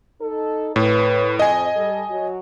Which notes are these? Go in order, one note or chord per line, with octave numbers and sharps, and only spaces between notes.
D#4 A4
A2 B4 C#5
F2 D#5 G#5
G3 A4
F#3 F#4